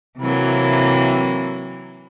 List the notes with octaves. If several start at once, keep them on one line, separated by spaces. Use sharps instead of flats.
C3 E3 F#3 A#3